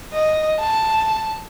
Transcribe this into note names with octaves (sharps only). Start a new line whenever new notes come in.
D#5
A5